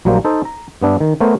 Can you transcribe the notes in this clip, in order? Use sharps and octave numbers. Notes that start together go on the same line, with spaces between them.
A#1 F#3 G3 A#3 C5
D#4 A4 C5
A#5
G2 B3 D4 E5
D#3
A3 B3 A#4 C5 C#5